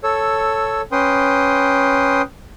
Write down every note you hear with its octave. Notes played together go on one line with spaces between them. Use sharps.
A4 C#5 E6
C#4 B4 G5 C6 D#6